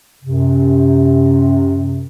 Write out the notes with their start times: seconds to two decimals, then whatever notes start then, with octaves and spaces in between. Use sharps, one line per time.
0.23 F#2 C3